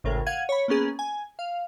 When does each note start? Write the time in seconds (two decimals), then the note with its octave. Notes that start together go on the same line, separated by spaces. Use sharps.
0.04 G#1 C#2 A2 C#3 A#4
0.26 F5 F#5 G#6 D#7
0.49 C#5 B5
0.68 A#3 B3 C#4 G#4
0.99 G#5
1.39 F5